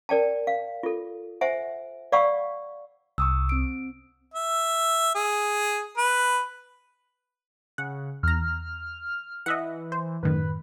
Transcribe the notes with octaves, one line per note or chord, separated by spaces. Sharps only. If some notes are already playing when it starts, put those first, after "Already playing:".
A#4 D5 G5 A5
F5
F4 A4
C5 E5 F#5 G#5
D5 F5 F#5 B5 C#6 E6
C2 C#6 D#6 E6
C4 D7
E5
G#4
B4
C#3 F#5
E2 A#5 F6
E3 D#5 E5 F#5
C5
F#2 A2 D#3 B4